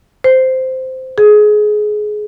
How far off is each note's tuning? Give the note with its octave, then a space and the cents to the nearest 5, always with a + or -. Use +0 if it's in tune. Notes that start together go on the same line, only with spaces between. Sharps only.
C5 -10
G#4 +20